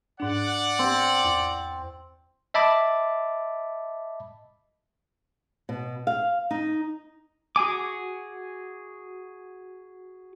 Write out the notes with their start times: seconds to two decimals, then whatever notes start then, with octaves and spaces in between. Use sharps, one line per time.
0.20 G#2 D4 D5 F#5
0.79 C4
1.24 E2
2.54 D#5 E5 A5 B5 D6
5.69 B2
6.07 F5
6.51 D#4
7.56 F#4 G#4 G#5 D6